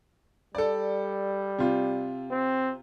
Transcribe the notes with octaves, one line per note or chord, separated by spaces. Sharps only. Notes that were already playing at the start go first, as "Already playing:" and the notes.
G3 A4 D5
C3 F4
C4